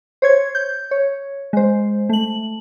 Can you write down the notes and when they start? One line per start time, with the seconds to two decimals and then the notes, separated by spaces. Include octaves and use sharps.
0.22 C5 C#5 G#6
0.55 G6
0.91 C#5
1.53 G#3 C5
2.09 A3 F#7